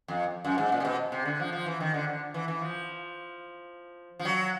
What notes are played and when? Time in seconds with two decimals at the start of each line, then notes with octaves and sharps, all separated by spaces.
0.08 F2
0.45 F#2
0.58 G#2
0.72 A#2
0.80 C3
0.85 B2
1.12 C3
1.25 D3
1.40 F3
1.52 F3
1.66 E3
1.80 D#3
1.94 D3
2.08 D3
2.34 E3
2.48 E3
2.61 F3
4.19 F3
4.25 F#3